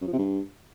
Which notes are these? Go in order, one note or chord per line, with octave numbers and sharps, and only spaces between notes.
F#2
F3
C3
G2